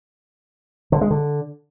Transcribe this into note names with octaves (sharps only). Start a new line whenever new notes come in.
D3
G#3
D3